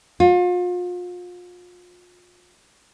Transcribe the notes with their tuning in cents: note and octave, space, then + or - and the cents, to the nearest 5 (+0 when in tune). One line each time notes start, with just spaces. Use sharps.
F4 +35